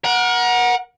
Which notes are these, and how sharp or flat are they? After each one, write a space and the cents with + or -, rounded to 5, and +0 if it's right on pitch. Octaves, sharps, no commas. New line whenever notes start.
A#4 +30 F#5 -10